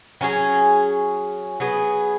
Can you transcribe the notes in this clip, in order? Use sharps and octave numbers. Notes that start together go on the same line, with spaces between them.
F#3 C#4 G#4
F#3 B3 G#4